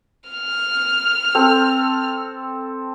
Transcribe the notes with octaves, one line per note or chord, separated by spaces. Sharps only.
F6
C4 A4